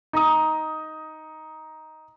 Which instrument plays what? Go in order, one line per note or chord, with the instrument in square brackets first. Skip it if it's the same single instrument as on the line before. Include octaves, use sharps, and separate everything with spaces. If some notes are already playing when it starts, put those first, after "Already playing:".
[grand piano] D#4 A#5 D#6